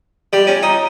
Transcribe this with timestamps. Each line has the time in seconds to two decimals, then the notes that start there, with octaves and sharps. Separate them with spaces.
0.33 G3
0.47 C#4
0.63 D#4